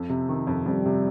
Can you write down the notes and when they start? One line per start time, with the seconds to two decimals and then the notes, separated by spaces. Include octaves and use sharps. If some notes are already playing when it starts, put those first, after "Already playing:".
Already playing: F2
0.10 C3
0.29 D#3
0.47 F2
0.66 F2 G3
0.86 C3